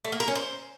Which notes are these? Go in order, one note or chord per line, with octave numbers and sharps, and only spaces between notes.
A3
A#3
A#4
C#4
C5